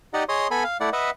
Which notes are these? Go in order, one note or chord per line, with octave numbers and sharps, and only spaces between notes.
D#4 G4 D5 D#5 F#5
G#4 C#5 D#5 C6 D#6
B3 A4 G#5 B5
F5
A3 E4 D5 F#5
B4 D#5 E5 F#5